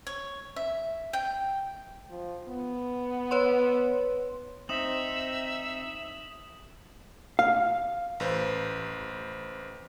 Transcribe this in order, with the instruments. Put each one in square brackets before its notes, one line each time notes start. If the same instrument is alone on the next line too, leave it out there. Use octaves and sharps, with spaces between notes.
[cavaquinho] C#5
E5
G5
[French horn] F3
B3
[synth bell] B4 C#5 C6
[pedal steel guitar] C4 D#4 [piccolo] E5 [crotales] D#6 E7 F#7
[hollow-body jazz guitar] F5
[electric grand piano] A1 B4 C5